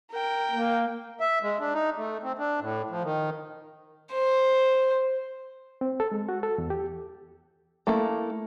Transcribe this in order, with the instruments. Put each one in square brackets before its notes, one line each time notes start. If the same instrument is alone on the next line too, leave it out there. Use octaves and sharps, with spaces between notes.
[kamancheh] A#4 G5
[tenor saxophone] A#3
[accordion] E5
G#3
D4
D#4
A3
C4
D4
A2
F3
D#3
[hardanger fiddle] C5
[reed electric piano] C4
A4
G#3
F#4
A4
E2
G4
[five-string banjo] A3 A#3 E4